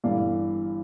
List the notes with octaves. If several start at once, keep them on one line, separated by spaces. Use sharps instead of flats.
G1 G2 E3 G3 D5 F5